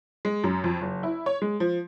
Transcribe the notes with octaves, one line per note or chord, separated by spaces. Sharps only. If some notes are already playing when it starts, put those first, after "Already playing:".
G#3
F#2
F2
F#1
E4
C#5
G#3
F3